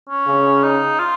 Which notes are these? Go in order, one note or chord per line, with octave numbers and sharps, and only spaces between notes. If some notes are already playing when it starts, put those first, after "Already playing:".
C#4
C#3
D#4
F4